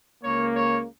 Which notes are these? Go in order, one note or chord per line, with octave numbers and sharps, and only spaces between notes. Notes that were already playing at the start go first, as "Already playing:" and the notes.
C#2 C#3 A#3 C#5
C#5